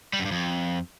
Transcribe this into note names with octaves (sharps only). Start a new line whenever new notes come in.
G3
F#2
G2
F2